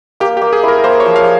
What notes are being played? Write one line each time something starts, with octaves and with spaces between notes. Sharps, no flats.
A#3 G4
G4
A#3
G#4
E4
A#4
A#3 C5
C#5
F3
F5